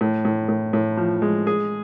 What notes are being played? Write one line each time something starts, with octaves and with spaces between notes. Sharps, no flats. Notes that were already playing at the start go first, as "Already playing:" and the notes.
A2
A2
A2
A2
F3
G#3
G#4